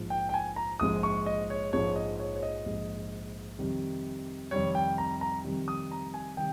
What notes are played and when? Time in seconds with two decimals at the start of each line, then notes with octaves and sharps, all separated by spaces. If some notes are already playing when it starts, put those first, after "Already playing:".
Already playing: A#1 G#2 F3 G#3
0.10 G5
0.29 G5
0.34 G#5
0.56 A#5
0.80 A#1 G#2 F3 G#3 D#6
1.03 C#6
1.26 D#5
1.50 C#5
1.73 A#1 G#2 F3 G#3 C#5
1.96 D#5
2.20 C#5
2.36 C#5
2.43 D#5
2.66 A#1 G#2 F3 G#3
3.59 F2 C3 D#3 G3
4.51 F2 C3 D#3 G3 C#5
4.75 G5
4.98 A#5
5.21 A#5
5.44 F2 C3 D#3 G3
5.68 D#6
5.91 A#5
6.14 G#5
6.37 C3 D#3 G3 G5